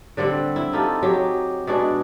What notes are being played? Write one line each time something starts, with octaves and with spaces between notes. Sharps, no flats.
D3 G3 C4 F#5
E4
D#4 F4 G4 A4
F#3 G4 G#4
B2 G#3 D4 G#4